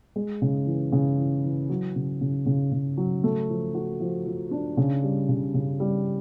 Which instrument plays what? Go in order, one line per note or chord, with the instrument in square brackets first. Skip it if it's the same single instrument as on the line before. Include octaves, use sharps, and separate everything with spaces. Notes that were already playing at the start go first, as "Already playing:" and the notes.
[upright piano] G#3
C#3
E3
C#3
E3
E3
F#3
C#3
C#3
C#3
C#3
F#3
A3
F3
F#4
F3
F3
D4
C#3
G3
C#3
C#3
G3